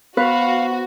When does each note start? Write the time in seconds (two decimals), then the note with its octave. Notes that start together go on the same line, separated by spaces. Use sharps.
0.17 B3 F#4 B4 C5 F5